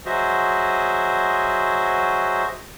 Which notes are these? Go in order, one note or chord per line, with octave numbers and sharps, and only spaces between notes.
F#3 F#4 G#4 C5 D#5 E5